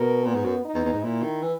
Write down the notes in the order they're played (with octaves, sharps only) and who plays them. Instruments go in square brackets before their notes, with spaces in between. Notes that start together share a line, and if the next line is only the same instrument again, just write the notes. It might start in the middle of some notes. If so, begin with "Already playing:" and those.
Already playing: [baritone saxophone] B2 [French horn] A#4
[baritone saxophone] A#2 [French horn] B3
[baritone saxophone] G#2
F#2
[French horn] D#4
[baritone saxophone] E2
E2
G#2
[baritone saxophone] A#2 [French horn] E4
[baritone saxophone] D#3
E3